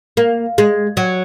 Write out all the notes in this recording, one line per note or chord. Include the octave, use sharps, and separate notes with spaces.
A#3
G#3
F#3